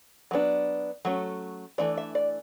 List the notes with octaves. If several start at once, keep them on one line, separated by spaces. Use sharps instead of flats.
F#3 B3 D4
F#3 A3 C#4
E3 A3 D4 D5
E5
D5